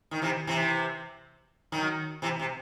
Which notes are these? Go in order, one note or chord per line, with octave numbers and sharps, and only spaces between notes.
D#3
C3 E3
C3 E3
D#3 F#3
C3 E3
C3